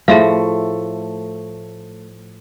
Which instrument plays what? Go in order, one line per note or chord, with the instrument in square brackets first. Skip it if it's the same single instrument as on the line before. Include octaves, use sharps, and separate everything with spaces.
[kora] A2 F3 [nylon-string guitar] A3 [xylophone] G#4 E5 F5